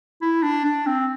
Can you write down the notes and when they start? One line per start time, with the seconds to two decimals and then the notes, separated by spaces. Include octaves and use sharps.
0.22 E4
0.43 D4
0.65 D4
0.86 C4